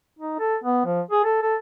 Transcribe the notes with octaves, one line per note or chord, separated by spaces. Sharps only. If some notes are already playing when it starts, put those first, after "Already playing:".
D#4
A4
B3
F3
G#4
A4
A4